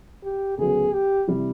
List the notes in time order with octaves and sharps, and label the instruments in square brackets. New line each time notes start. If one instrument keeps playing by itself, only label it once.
[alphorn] G4
[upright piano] D2 C#3 F#3 B3 [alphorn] G#4
[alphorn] G4
[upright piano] C3 E3 G3